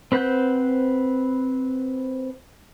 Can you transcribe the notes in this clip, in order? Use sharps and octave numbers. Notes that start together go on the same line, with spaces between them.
C4 B4 C5 F#5 G6